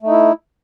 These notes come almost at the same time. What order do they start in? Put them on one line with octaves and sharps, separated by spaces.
A3 D#4 E4